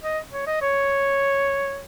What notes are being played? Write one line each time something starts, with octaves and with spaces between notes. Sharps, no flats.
D#5
C#5
D#5
C#5